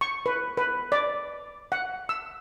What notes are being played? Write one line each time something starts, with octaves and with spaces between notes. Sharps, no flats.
C#6
B4
B4
D5
F#5
E6